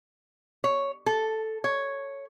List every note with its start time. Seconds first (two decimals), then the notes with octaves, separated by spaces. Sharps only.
0.64 C#5
1.06 A4
1.64 C#5